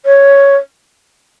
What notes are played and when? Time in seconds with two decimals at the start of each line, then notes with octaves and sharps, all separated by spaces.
0.06 C#5